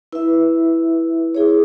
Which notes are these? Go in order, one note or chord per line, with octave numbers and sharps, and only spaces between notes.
E4 B4 E5
E4 G#4 C#5